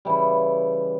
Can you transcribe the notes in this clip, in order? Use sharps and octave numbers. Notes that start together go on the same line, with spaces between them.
C#3 E3 G3